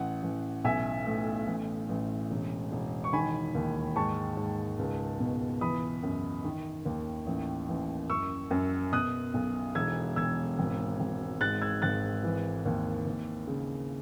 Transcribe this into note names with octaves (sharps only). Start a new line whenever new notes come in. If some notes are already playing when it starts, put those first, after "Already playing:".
Already playing: A1 F#5
A1
B1 E5 G#5
A2
A1
A1
E1
E1
C#6
D#3 G#5 B5
D#2
G#2 A5 C#6
G#2
C#2
B2
E3 B5 D#6
F#2
D#3
D#2
A1
A1
F#2 C#6 E6
F#2
B2 D#6 F#6
B1
E1 E6 G#6
E1 E6 G#6
G#1
G#1
G#2 F#6 A6
E6 G#6
G#1 F#6 A6
E3
D#2
D#2
C#3